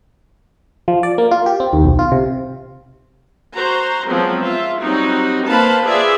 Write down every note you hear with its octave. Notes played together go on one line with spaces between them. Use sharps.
F3
D5
A#3
F4
G4
C4
D#2
B1
F4
C3
F#4 C5 A#5
F3 F#3 G#3 B3 C4
F4 E5
F#3 G3 C4 D#4 F#4
A#3 B4 C5 F5 A5 B5
F4 G#4 B4 D5 E5